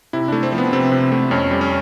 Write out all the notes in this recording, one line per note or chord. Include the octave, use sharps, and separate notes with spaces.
C3 E4
A3 D4
C4
F3
B3
C3 C4
C3
A3
F2 C#4
G3
C#4